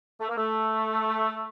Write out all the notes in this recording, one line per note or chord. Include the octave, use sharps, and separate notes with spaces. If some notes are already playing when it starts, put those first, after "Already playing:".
A3
A#3
A3